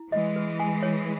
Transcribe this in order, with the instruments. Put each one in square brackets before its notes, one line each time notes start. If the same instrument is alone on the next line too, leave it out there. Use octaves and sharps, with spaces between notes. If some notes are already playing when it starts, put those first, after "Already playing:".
Already playing: [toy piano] E4
[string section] E3 G#3 [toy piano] D#5
[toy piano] B4
G#5
C#5